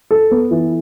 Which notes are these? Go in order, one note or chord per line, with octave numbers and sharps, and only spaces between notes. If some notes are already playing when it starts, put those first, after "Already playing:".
A4
B3
E3